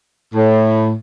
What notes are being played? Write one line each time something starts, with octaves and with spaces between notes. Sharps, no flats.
A2